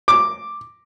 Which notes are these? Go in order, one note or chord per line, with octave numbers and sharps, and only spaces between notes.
D6